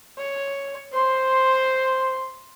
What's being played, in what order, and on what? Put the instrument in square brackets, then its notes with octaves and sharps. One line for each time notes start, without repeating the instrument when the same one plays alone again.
[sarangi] C#5
[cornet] C5 [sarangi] C6